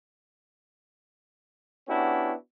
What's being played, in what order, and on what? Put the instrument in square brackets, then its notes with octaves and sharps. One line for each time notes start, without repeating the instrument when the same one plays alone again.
[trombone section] B3 C#4 D4 E4 F#4 G4